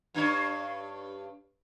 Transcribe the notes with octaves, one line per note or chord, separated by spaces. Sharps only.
G2 D4 C#5